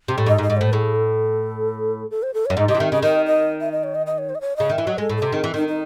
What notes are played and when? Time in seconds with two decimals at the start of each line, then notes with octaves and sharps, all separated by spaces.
0.08 C3
0.18 A2
0.26 G#2 D#5
0.38 G#2
0.42 D#5
0.50 G#2
0.57 A2 C5
0.73 A2 G#4
0.95 A4
2.11 A4
2.23 C5
2.34 A4
2.46 F#2 C#5
2.57 G#2 D#5
2.68 C3 D#5
2.75 E3
2.79 D#3 E5
2.92 C#3 D#5
3.03 D#3 D#5
3.26 D#5
3.60 E5
3.72 D#5
3.83 C#5
3.95 D#5
4.06 D#5
4.18 C#5
4.29 C5
4.35 D#5
4.41 C#5
4.56 C#3 D#5
4.70 D#3 E5
4.78 E3
4.87 F#3 D#5
4.97 G#3 G#4
5.02 A4
5.10 A2
5.17 C3 A4
5.32 D#3 G#4
5.44 E3
5.54 D#3 D#4
5.68 D#4